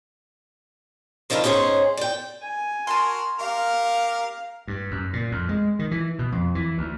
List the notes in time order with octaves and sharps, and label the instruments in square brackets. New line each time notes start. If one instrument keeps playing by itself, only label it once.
[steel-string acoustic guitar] D#3 F3 D4 E4 G4 A#4
G#2 C#4 G#4 C5 C#5
D5 G5
[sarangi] G#5
[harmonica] F#4 A#4 [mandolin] A5 C6
[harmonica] G4 A#4 [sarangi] F5
[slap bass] G2
F#2
A#2
F2
G#3
D#3
E3
B2
F2
E3
D2